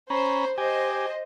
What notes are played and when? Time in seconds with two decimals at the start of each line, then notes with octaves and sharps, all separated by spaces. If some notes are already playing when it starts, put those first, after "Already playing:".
0.10 C#4 C5 A#5 B5
0.58 G4 C5 D#5 G#5